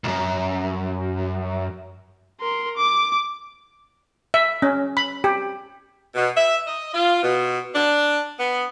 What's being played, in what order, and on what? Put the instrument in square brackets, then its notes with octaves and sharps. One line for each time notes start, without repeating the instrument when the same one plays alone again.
[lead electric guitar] C2 F#2
[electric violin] A#4 C6
D6
[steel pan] E5
C#4
B5
G4
[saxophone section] B2
E5
D#5
F4
B2
D4
B3